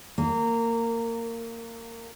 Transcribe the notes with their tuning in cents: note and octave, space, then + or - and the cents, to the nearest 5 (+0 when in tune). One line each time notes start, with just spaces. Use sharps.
A#3 -20